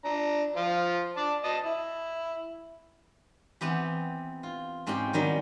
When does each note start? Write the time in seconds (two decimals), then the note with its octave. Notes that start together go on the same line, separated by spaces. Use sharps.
0.05 D4 A#5
0.56 F3 F4
1.17 D5 A5 D6
1.44 D#5 A5
1.65 E4
3.61 E3 B3 C4 G4
4.43 F4
4.87 G#2 C4 C#4 G4 G5
5.13 D#3 F#3 G3 D#4